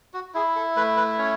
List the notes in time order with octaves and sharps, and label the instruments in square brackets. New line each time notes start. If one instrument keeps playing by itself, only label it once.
[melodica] F#4
E4 G#4
A4
A3 B4
B4
C#4 C#5